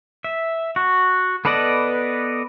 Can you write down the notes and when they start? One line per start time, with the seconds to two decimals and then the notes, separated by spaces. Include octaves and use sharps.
0.24 E5
0.76 F#4
1.45 B3 A4 B4 D5 D#5